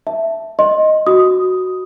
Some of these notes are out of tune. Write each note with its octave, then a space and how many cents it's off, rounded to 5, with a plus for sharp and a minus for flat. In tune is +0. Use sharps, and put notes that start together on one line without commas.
E5 +0 A5 +0
D#5 +0 C6 +25
F#4 +0 B5 +0 D#6 +0